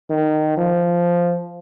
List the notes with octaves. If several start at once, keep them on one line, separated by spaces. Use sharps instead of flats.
D#3
F3